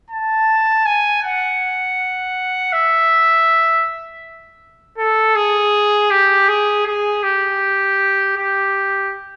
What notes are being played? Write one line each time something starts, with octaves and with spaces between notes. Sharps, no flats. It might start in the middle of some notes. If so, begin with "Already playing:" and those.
A5
G#5
F#5
E5
A4
G#4
G4
G#4
G#4
G4
G4